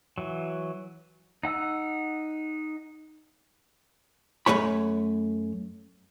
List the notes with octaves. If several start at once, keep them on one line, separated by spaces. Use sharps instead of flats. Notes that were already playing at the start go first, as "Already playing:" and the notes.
E3 F#3
D#4 F#5 E6
F#2 E3 A3 C#5 B5